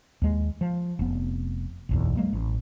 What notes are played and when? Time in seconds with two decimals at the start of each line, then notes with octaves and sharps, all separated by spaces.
0.22 D#2 G#3
0.61 F3
0.99 F1 B3
1.89 F#1 B1 E2
2.17 F#3 G#3 A#3
2.33 A1